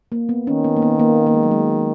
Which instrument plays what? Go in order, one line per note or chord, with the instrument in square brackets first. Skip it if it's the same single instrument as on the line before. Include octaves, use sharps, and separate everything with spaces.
[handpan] A#3
B3
[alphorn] D#3 [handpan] C#4
[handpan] B3
A#3
B3
A#3
A#3
G#3
F#3
G#3